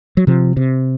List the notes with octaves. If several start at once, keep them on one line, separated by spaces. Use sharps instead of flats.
F#3
C3 F3
C3